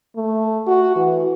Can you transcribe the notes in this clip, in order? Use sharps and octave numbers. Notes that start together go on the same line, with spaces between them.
A3
F#4
E3